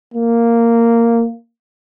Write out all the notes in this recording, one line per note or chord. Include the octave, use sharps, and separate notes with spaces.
A#3